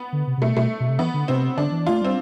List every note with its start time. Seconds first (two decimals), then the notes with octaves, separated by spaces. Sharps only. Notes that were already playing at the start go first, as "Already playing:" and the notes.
Already playing: B3
0.13 D3
0.27 C3
0.37 C3
0.42 B2 A3
0.56 B2 A3
0.80 B2
0.89 C3
0.99 E3 B3
1.14 D3
1.28 C3 C4
1.57 D3 D4
1.71 E3
1.87 A3 F4
2.02 G3 C4